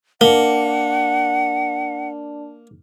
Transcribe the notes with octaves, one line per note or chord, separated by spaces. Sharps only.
A#3 D4 A#4 D5 F#5 A5